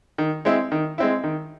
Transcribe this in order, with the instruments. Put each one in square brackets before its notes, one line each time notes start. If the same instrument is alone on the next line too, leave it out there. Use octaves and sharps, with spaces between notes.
[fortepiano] D#3
G#3 C4 E4
D#3
G#3 C4 E4
D#3